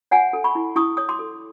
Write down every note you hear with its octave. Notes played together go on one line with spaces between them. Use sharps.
C#5 F#5 G#5
A4
B5 C#6
E4
E4 C#6 D#6
C#5 D#6
C6 D6
A4